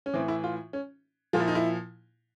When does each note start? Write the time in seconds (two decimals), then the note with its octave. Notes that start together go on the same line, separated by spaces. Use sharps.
0.06 C#4
0.14 A2 E3 C4
0.28 E4
0.44 F4
0.73 C#4
1.33 A#2 F3 F4
1.40 E4
1.48 D#4
1.55 E4